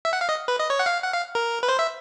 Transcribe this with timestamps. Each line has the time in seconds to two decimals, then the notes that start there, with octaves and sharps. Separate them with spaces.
0.05 E5
0.13 F#5
0.21 F5
0.29 D#5
0.48 B4
0.59 D#5
0.70 C#5
0.79 F#5
0.86 F5
1.03 F#5
1.14 F5
1.35 A#4
1.63 B4
1.69 C5
1.79 E5